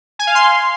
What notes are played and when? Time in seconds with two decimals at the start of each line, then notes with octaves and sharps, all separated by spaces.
0.19 G#5
0.27 F5
0.35 C6